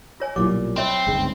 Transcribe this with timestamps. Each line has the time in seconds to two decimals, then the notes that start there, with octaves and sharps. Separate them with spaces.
0.20 F4 C#5 G#5
0.36 B1 A#2 F#3 G3 E4 F4 D6
0.77 C4 C#5 E5 B5
1.07 G1 C#2 G#2 G#4